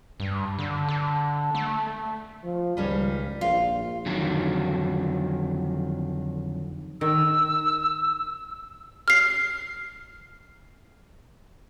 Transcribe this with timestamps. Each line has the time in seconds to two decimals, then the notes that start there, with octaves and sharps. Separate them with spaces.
0.20 G2
0.59 D3
0.89 D3
1.55 A3
2.44 F3
2.77 C#2 D#3 G3 C#4
3.41 A#1 F4 F5
4.06 F2 D3 D#3 F#3
7.01 D#3 E6
9.08 F6 C7